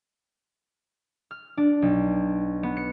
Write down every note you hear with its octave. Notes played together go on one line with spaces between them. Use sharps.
F6
D4
B1
B3
C#7